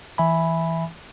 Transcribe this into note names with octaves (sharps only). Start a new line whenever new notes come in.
E3 E5 G#5 B5